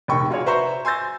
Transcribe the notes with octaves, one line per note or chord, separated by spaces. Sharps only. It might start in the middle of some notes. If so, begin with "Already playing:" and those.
F1 A#1 D#3 G5 C#6
F4 F#4 G#4 C#5 D5
F#4 B4 C5 E5 A#5 C#6
G#5 C6 E6 G6 A6 A#6